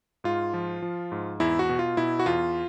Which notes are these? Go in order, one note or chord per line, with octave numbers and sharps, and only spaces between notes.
G#2 F4
F3
F3
G#2
E2 E4
F#4
B2
F4
B2 E4
F#4
E2 F4